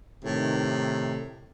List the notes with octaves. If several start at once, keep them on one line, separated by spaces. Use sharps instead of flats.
A2 C3 D#3